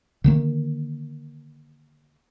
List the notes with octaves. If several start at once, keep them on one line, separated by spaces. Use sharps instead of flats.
D3 D#3 A#3